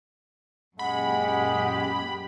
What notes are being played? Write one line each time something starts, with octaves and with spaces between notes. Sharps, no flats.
F#2 A#2 G#3 G4 F#5 B5